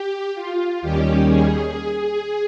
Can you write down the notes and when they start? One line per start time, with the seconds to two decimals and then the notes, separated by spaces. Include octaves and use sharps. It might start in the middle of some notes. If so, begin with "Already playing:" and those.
Already playing: G4
0.35 F4
0.81 D#2 D#3 G3 C#4 G4
1.28 G#4